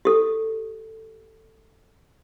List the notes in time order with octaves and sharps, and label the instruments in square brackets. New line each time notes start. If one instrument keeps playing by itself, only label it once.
[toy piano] G4 A4